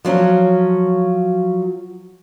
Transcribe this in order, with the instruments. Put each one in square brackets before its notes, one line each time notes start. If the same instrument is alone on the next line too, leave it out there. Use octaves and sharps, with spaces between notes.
[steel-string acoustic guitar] F3 F#3 C#4